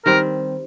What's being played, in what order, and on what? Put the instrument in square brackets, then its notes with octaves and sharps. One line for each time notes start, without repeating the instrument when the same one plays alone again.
[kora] D#3 G3 C4 [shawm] A#4